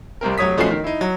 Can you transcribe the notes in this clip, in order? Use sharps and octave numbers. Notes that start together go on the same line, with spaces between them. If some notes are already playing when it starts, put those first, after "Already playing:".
C2 C3 C4 A#4
F1 F#3 C#5 D#6 B6
B1 F3 A3 C#4 F#4 C7
D#3
D#4 E4
F#3